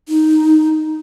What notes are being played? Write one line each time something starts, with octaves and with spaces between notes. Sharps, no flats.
D#4